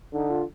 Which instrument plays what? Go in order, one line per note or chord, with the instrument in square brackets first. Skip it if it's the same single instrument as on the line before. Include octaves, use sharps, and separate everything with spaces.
[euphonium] D3 [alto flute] D#4
[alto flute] F4